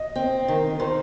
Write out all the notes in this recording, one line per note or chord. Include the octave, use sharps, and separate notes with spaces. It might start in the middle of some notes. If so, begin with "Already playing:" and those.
Already playing: D#5
C4
D#3
A#4
D#3 C5